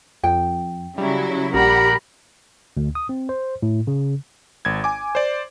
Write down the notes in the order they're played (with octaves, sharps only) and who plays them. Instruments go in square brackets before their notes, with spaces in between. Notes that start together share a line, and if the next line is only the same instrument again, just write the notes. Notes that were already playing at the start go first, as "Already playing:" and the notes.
[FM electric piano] F2 [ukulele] G5
[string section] C#3 F#3 E4 [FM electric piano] G3
[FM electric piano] A#1 G3 [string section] G4 F#5 B5 [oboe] A#4
[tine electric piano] D2
D#6
C4
C5
A2
C#3
[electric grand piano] G#1 G#6
G#5 D6
C5 D5